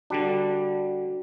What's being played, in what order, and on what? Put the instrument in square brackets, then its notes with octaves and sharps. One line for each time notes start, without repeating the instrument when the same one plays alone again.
[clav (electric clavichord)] D3 G3 D4 [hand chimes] F#4